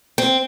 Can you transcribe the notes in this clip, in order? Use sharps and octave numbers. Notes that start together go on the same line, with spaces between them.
C4